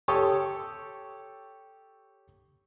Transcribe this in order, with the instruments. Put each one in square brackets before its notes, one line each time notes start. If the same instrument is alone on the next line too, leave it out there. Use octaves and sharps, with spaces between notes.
[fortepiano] G4 A4 C#5 C#6 D#6